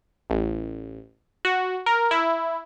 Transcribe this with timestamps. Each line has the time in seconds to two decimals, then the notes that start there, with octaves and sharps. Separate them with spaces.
0.30 A1
1.45 F#4
1.86 A#4
2.11 E4